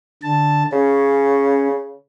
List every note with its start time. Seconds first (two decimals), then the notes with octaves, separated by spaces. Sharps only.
0.23 D3 A5
0.73 C#3 C#4